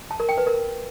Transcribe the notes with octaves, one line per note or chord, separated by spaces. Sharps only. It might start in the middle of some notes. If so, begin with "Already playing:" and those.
A5
A#4
G5
B4
A#4